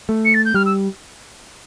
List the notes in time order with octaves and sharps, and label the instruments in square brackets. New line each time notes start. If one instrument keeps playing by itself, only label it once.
[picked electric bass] A3
[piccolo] C#7
A6
G6
[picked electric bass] G3 [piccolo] F6
[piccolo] E6